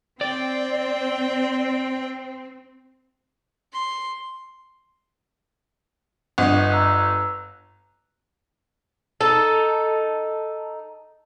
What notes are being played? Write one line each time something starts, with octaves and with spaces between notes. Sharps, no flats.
C4 D5 G5
C6
G1 D#5 F#5 D#6
A#5 E6 F#6
D#4 A4